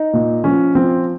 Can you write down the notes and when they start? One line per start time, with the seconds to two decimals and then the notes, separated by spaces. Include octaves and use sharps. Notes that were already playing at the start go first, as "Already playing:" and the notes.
Already playing: D#4
0.13 A#2
0.44 F3 C#4
0.75 F3 C4